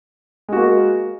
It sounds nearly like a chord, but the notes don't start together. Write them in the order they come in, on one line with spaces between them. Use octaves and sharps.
G#3 F#4 A#3